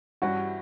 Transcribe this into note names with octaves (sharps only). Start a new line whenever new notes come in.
G2 E3 G3 C#4 E4 F#4